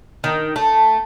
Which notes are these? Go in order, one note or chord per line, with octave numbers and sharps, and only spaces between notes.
D#3
A3